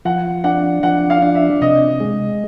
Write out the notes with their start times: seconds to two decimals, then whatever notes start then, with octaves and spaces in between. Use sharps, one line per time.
0.05 F3 F#5
0.44 D4 F#5
0.83 F3 F#5
1.10 F5
1.22 D4
1.35 E5
1.61 C3 D#5
2.00 G#3